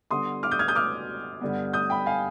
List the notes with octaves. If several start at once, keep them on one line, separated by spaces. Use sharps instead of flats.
D3 G3 B3 C6 D#6
D6 F6
D#6 G6
F6 G#6
D#6 G6
D6 F6
G2 D3 G3 B3
D#6 G6
G5 B5
F5 G#5